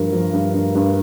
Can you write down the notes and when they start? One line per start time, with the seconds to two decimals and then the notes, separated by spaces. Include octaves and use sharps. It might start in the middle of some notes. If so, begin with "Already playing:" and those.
Already playing: G2 F3 A#4
0.13 F3
0.33 G2
0.54 G2
0.75 G2